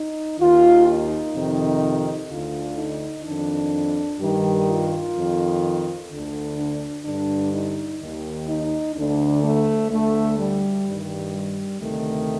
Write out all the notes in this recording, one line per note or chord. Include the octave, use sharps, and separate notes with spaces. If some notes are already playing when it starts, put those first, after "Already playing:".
Already playing: D#4
D#2 D#3 F4
D#4
F2 C3 D#3
D2 D3 F4
D#4
F2 D#3 D4
G2 D#3 G3
F4
F2 D#3
D2 D3
D4
G2 D3 D4
D#4
D#2 D#3
D#4
D2 D3 D4
A3
D2 D3 A3
G3
G2 D#3
G3
D2 C3 D#3 A3